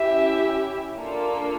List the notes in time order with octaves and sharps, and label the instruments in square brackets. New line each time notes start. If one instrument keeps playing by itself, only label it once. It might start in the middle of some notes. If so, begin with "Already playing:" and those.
Already playing: [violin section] C#4 E4 G4 E5
A#3 D4 F4 A4